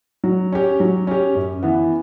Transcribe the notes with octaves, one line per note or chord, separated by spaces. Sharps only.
F#3
C#4 G4
F#3
C#4 G4
F#2
E3 B3